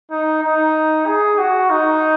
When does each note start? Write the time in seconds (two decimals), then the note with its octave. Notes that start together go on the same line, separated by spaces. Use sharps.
0.11 D#4
0.43 D#4
1.06 G#4
1.38 F#4
1.70 D#4